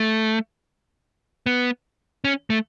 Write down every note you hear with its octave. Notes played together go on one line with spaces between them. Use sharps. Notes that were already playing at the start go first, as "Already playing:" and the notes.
Already playing: A3
B3
C#4
A3